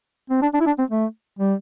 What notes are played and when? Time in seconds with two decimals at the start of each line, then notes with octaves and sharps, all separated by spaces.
0.30 C4
0.42 D4
0.54 D4
0.61 E4
0.66 D4
0.79 C4
0.90 A3
1.39 G3